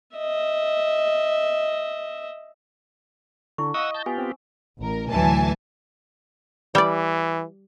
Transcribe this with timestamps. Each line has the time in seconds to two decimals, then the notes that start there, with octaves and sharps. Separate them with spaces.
0.17 D#5 E5
3.58 D3 E4 C#6
3.74 D#5 F5 F#5 C#6 D#6 E6
3.94 A5 G6
4.06 B3 F4 G4 G#5
4.18 C4
4.78 A1 A#4
5.10 D2 A2 E3 F#3 G#5 A5
6.75 E3 G3 D5